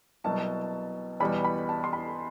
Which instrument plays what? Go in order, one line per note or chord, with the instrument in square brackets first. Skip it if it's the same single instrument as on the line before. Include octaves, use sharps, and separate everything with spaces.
[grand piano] C2 B2 F#3 [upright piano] A5
[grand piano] E2 B2 G3 [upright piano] B5
[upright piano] B5
A5
C6
B5